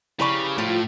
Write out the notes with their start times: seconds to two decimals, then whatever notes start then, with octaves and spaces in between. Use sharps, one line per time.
0.20 C#3 E4 G4 B4 C#5 D5 C#6
0.58 A2 F3 G3 F4